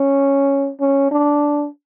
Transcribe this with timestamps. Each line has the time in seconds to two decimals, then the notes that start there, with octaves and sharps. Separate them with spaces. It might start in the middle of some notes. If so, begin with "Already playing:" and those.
Already playing: C#4
0.80 C#4
1.11 D4